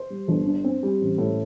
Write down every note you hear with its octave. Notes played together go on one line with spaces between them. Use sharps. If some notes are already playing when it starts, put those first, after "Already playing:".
Already playing: C5
G3
G1
G2
C4
G3
A1
A2